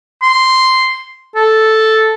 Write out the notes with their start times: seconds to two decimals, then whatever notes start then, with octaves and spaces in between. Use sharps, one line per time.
0.22 C6
1.36 A4